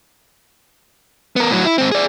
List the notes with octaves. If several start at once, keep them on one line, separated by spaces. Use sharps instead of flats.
B3 A#4
A2 F#3
E4
G#2 C4
G#4 D5